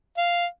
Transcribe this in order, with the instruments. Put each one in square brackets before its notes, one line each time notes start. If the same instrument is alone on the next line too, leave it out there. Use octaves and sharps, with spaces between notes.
[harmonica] F5